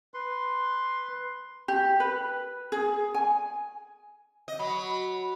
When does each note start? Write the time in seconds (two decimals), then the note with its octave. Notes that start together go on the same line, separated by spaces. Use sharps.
0.14 B4 C6
1.68 G4
2.00 B4
2.72 G#4
3.14 G#5
4.48 D#5
4.59 F#3 B5